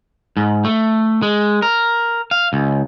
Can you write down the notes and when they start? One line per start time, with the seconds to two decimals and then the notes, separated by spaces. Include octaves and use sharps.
0.37 G#2
0.64 A3
1.22 G#3
1.62 A#4
2.31 F5
2.53 C#2